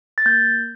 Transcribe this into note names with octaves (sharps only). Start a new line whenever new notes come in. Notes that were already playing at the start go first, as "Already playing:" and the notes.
A6
A#3 G6